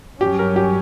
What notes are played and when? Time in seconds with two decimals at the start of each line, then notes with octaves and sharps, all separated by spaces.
0.21 G2 F#3 C#4 G4
0.39 A#4
0.56 G4